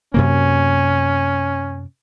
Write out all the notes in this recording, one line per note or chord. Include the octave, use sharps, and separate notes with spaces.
F#2 C3 A#3 C#4